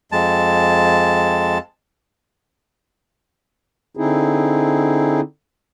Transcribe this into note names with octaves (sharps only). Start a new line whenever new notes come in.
F2 G#3 A5
D3 C4 D#4 E4 G#4